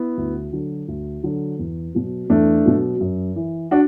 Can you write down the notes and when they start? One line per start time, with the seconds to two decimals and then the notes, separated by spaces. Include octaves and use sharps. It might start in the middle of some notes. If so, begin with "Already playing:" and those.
Already playing: B3 E4
0.17 D2
0.52 D3 F#3
0.88 D2
1.23 D3 F#3
1.59 E2
1.94 B2 F#3
2.30 E2 A3 D4
2.65 B2 F#3
3.00 F#2
3.36 E3
3.71 D4 F#4